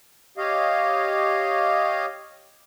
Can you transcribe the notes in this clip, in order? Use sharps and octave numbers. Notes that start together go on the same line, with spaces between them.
G4 C#5 D#5 F5